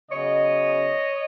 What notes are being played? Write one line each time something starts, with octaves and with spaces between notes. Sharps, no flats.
C#3 F#3 B3 C#5 D#5